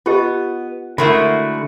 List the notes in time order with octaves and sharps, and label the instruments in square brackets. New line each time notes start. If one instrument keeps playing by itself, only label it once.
[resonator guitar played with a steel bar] B3 [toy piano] F4 G4 D#5
[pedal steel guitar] D3 F#4 [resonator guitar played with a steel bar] G#3 A3 E4 [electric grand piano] A#4 B5